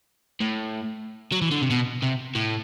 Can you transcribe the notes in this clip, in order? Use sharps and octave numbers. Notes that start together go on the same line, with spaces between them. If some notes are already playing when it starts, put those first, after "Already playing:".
A2
F#3
E3
D3
C3
B2
C3
A2